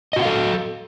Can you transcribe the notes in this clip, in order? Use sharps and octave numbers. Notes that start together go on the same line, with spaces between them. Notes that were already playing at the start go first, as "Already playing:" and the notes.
F#4 A4 D#5 F5 F#5